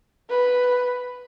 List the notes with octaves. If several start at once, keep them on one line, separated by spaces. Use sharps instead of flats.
B4